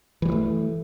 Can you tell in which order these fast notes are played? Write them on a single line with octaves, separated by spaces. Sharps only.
E3 G3 F#3 A3